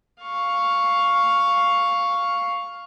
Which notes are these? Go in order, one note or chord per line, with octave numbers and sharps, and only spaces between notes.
F5 C#6